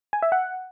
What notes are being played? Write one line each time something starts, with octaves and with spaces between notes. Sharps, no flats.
G#5
E5
F#5